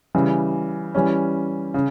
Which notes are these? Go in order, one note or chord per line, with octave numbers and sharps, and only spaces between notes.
C#3 E3 G3
E3 G3 C#4
C#3